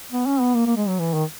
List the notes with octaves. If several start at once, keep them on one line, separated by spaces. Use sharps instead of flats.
B3
C#4
B3
A#3
A#3
G#3
F#3
E3
D#3